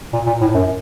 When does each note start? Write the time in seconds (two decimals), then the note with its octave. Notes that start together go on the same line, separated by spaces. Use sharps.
0.13 A#2
0.26 A#2
0.41 A2
0.54 F#2